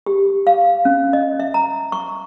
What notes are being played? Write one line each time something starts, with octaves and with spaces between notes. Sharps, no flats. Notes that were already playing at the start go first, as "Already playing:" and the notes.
G4
F5
C#4
D#5
E5
A#5
C#6